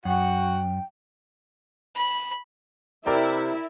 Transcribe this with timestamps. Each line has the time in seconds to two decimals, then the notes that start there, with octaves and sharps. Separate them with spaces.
0.05 F#2 F#4 F#5 G5
1.96 B5
3.06 C3 E4 A#4 D5 G5